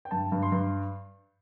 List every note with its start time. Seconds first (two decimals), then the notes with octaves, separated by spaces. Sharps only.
0.05 G5
0.11 G2 A5
0.32 G2
0.42 C6
0.52 G2